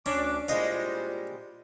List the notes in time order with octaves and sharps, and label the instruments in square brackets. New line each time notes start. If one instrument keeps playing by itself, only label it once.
[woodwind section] D2 D6 [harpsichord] C#4 [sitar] D4
[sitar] A#2 G3 G#3 [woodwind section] E4 F4 C5 [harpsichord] D#5 F5